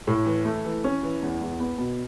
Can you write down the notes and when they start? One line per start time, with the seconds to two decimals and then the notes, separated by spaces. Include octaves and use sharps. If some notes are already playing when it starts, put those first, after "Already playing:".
0.07 A2
0.26 E3
0.45 A3
0.65 E3
0.84 C#4
1.03 E3
1.22 E2
1.41 E2
1.60 B3
1.78 B2